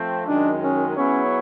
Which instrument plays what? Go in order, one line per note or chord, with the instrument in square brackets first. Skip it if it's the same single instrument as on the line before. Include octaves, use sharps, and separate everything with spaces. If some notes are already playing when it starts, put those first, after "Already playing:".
Already playing: [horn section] F3 A3 C4
[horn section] F#2 D#3 G#3 [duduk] D4
[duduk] C#4
[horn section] F#3 B3 E4 G#4 C#5 [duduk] C#4